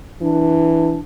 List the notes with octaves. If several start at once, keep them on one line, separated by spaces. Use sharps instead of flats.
E3 D4